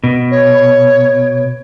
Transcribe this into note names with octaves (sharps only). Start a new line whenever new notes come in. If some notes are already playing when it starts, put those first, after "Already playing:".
B2
C#5